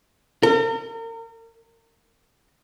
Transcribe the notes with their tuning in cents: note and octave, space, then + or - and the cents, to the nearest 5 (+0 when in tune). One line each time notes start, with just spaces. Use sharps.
A#4 -35